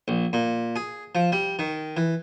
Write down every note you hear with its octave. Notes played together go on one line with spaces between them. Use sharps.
A#1
A#2
G#4
F3
G3
D#3
E3